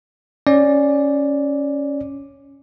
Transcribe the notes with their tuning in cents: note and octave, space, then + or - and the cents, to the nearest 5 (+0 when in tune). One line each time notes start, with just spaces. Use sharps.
C#4 +0 D5 +0